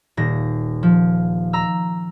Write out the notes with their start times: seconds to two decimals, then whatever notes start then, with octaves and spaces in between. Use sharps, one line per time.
0.17 D#1 A#6
0.83 F3
1.53 A#5 E6